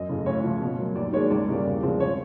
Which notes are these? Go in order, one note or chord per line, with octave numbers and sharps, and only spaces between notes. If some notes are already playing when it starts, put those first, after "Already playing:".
Already playing: F#2 D#5
C#3 E3 A3
D2 C#5
C#3 F3
B2
F#3 A#3
D#2 D5
D#3 G#3 C#5
C#2 D5
C#3 E3 G3 A#3
E2
C#3 F3 G#3 C4
C#5